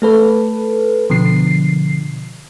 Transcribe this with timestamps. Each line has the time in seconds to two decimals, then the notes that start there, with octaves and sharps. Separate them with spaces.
0.02 A3 A4 B4
1.10 B2 D3 F3 C7